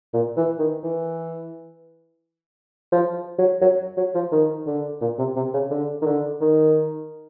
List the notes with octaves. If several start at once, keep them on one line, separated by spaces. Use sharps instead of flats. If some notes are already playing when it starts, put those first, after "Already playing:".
A#2
E3
D#3
E3
F3
F#3
F#3
F#3
F3
D#3
D3
A#2
C3
C3
C#3
D3
D#3
D3
D#3